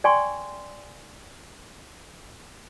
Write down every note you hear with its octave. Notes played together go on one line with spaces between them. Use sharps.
D5 G5 G#5 C6 C#6